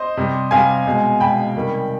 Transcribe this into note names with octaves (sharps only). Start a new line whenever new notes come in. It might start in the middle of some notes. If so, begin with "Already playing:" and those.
Already playing: C5 D#5
C3 G3
C3 G3 F5 G#5
B2 G#3
B2 G#3 G5 B5
C3 D#3 G3